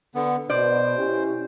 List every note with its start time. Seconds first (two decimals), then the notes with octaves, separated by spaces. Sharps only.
0.15 D3 B3
0.50 B2 C5 D5
0.98 C#4 E4 G4